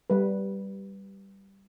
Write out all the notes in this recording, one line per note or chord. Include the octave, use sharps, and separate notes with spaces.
G3 B4